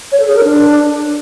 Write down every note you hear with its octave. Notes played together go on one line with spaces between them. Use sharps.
C#5
A4
G#4
A#4
D4